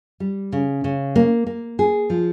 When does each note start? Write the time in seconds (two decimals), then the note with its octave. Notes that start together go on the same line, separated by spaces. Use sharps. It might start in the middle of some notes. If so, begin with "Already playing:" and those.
0.20 G3
0.52 C#3
0.84 C#3
1.16 A#3
1.47 A#3
1.79 G#4
2.10 F3